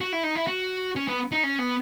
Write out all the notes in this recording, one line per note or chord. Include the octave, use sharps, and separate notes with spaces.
F#4
E4
D#4
E4
F#4
C#4
B3
D#4
C#4
B3